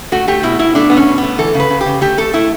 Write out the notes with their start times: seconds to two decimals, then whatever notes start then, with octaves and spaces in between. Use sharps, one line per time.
0.12 A3 F#4
0.28 A3 G4
0.43 B2 E4
0.59 B2 E4
0.75 A3 D4
0.90 B2 B3
0.97 C#4
1.07 B2
1.18 A3 B3
1.38 E3 A4
1.54 C#3
1.60 B4
1.70 C#3
1.81 G4
1.86 C#3
2.01 A3 G4
2.17 A3 A4
2.33 A3 E4